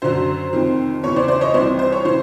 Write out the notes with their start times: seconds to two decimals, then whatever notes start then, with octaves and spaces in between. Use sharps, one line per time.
0.02 F#2 D3 F#3 C5
0.53 F2 C3 D#3
1.03 E2 C#3 E3 C#5
1.16 C5 D5
1.28 C5 D5
1.41 C#5 D#5
1.54 C2 C3 E3 C5 D5
1.79 C5
1.92 C#5
2.04 C#3 E3 C5